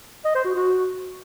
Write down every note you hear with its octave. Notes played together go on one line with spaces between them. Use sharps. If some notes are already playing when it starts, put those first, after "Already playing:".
D#5
C5
F#4
F#4